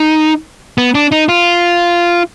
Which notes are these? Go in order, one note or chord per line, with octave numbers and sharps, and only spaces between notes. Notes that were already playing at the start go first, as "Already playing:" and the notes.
Already playing: D#4
B3
D4
D#4
F4